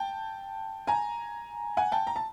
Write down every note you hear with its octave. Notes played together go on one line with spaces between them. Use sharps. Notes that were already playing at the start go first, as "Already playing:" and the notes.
Already playing: G5 A5
G#5 A#5
F#5 G#5
G5 A5
A#5
A5